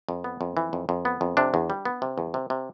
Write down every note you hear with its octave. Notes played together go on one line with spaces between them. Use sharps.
F2
B3
F2
E3
F2
F2
B3
F2
C3 D4
E2
G3
B3
C3
E2
C3
C3